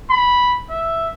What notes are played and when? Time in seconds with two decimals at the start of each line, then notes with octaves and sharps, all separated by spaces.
0.11 B5
0.70 E5